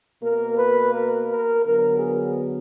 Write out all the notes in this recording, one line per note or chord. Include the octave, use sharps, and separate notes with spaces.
B2 A#3 A#4
B4
A#4
A#4
D3 F#3 B3 A#4
G#4